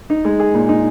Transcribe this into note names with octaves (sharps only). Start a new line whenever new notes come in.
D#4
G#3
G#4
A#2
D#4